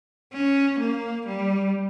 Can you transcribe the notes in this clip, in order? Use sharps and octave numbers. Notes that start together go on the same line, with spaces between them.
C#4
A#3
G3